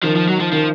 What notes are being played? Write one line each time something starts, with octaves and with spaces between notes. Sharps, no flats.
D#3 F3
F3
F#3
F3
D#3 F3